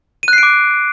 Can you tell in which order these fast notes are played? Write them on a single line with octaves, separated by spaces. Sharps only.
D#7 F#6 C7 D7 D6